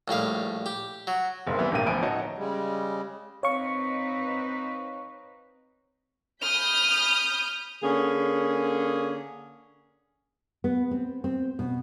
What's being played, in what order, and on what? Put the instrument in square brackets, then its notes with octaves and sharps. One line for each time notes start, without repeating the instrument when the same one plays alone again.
[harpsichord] A#1 A2 G3 F5
G4
F#3
[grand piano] F#1 B1 G#3 A#3 C4 C6
E3 G3 B3 C4 E4
D1 G2 B2 A#3 G5 D#7
A1 D2 F3 B3 G#5 D7
D#4 F#4 C#5 D#5 E5 A5
[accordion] C#3 G3 G#3
[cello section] C4 D#4 B4 [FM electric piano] C#5 F5 C#6
[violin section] B5 D#6 G6 [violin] F6
[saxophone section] D3 A#3 C#4 G#4
[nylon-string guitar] B3
C4
C4
B2